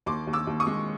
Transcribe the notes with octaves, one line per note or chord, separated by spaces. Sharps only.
D#2 C6 D6
D#2
D6 E6
D#2
C#6 D#6
G#3